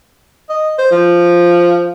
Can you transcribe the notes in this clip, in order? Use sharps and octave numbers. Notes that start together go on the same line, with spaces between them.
D#5
C5
F3